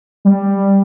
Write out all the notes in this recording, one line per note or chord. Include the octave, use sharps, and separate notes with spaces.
G3